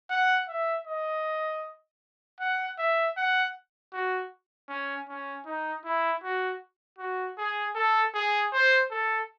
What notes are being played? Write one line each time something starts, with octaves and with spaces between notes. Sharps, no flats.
F#5
E5
D#5
F#5
E5
F#5
F#4
C#4
C#4
D#4
E4
F#4
F#4
G#4
A4
G#4
C5
A4